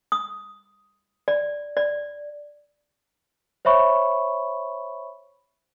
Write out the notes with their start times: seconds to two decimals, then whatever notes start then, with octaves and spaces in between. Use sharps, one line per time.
0.12 D#6
1.28 D5
1.77 D5
3.65 C5 C#5 E5 B5 C#6